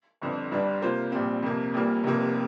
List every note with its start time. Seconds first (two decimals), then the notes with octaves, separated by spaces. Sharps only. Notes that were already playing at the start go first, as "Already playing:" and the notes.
0.22 G1 F2 D3
0.52 G1 G2 G3 D4
0.82 C3 A#3 F4 C5
1.12 A#1 A#2 G3 C4
1.42 F2 C3 A#3
1.73 A#1 A#2 G3 A#3
2.04 F1 F2 C3 A#3